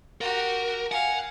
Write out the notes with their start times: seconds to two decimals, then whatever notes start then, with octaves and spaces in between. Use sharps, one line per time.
0.21 F#4 G4 A#4
0.92 F5 F#5 G#5